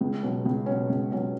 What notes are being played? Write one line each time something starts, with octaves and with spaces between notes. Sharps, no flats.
C#2
B2 F#3 C#4
C#2
B2 F#3 C#4
C#2
B2 F#3 C#4